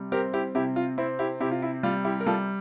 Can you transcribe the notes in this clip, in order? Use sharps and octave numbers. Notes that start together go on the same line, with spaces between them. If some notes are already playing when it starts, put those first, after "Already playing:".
Already playing: C3 G3
C4 G4 A#4
E4 G4
C3 E4 G4
F4
C4 E4
E4 G4
C3 E4 G4
F4
E4
G3 F4
E4 G4
A#4
G3 F4 A4